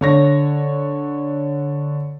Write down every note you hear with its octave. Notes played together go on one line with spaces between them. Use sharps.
D3 C#5 A#6